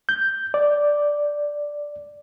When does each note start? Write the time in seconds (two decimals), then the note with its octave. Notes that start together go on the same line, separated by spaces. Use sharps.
0.09 G6
0.54 D5